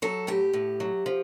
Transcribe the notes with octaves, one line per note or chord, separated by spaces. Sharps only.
F#3 A4
A2 G4
A2
F#3
F3